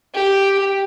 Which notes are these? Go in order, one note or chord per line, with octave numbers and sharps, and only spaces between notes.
G4